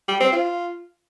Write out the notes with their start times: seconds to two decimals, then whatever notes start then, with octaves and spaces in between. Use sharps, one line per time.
0.08 G3
0.20 C4
0.32 F4